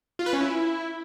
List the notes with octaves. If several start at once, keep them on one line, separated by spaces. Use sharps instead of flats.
F4
B4
C#4
E4